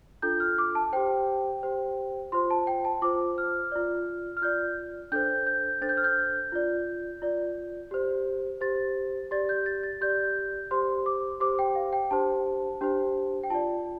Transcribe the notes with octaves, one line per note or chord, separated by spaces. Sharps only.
D4 F4 A4 G6
F6
D6
A5
G4 C5 G5
G4 C5
F4 C5 C6
A5
G5
A5
F4 C5 D6
F6
F4 D5
F6
F4 D5 G6
D4 A4 C5 G6
G6
D4 A4 C5 A6
G6
F6
G6
F4 D5
F4 D5
G4 C5
G4 C5 A6
G4 D5 A6
G6
A6
A6
G4 D5 G6
G4 C5 C6
D6
G4 C5 D6
G5
F5
G5
D4 G4 C5 A5
D4 G4 C5
G5
F4 D5 A5